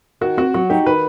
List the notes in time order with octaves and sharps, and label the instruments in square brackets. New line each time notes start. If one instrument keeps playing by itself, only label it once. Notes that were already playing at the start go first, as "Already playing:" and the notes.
[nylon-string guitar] D#3 [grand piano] F#4
[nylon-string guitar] C4 [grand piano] F#4
[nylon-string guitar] F#3 [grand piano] F#4
[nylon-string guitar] D#4 [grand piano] G4
[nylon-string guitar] D#3 [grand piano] B4